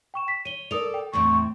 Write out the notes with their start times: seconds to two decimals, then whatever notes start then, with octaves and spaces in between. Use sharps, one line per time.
0.14 G5 C#6 E7
0.28 B6
0.45 C#5 D#7 G7
0.71 A4 A#4 D5 D#6 F7
0.94 G5
1.13 E2 A2 C4 C#6